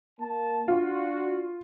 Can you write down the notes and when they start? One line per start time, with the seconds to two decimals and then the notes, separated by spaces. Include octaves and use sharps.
0.20 A#3 A5
0.68 D4 F4 F#4